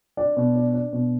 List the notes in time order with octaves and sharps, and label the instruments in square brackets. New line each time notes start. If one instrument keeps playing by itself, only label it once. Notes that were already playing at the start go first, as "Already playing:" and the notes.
[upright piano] D4 D5
B2
D4
D4
B2